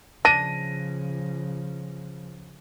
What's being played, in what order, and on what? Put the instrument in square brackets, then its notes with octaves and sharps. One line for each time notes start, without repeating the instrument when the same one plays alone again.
[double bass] C#3 F3 [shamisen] D4 [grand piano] A#6 D#7